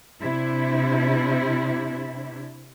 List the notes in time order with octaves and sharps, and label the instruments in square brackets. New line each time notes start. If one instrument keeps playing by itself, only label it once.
[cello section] C3 D4 E4